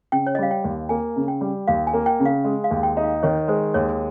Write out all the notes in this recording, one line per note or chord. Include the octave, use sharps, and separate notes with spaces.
C#3 G5
C#5
D#5
G3 F5
G5
D#2
A#3 G#5
C#3
G5
G3
D#2 F5
G#5
A#3
G5
C#3
F5
G#3
F5
D#2
G5
D#4
F5
D#3 C#5
G#3 C5
D#2 C#5